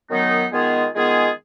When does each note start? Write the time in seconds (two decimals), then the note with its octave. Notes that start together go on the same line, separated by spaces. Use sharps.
0.10 F#2 D#3 F#3 B3 D#4
0.52 D#3 G#3 B3 F4 G#4
0.95 D#3 G#3 B3 F4 G#4